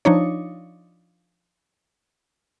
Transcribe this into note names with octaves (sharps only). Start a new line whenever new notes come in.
F3 D4 D#4 C#5